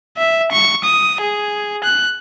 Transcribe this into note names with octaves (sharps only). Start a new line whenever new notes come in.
E5
C#6
D#6
G#4
F#6